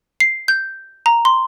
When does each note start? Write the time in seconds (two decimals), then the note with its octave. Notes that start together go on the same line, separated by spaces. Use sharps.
0.20 C7
0.48 G6
1.06 A#5
1.25 C6